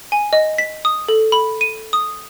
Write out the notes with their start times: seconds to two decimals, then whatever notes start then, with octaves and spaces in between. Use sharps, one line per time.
0.12 G#5
0.33 D#5
0.58 B6
0.85 D#6
1.09 A4
1.32 B5
1.61 D#7
1.93 D#6